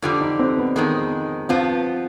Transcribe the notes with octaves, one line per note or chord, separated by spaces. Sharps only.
F2 D3 G3 F4
D#4
C4
B3
F2 D#3 G#3 B3
G2 F3 B3 C4 F4